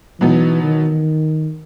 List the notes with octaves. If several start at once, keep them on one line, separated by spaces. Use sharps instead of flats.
B2 E3 F#3 B3 D#4
D#3